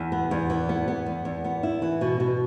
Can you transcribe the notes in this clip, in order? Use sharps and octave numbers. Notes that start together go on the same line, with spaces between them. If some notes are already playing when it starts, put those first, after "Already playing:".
Already playing: E2
B3
E2
E3
B3
B3
E2
E2
B3
E4
E3
B2
B2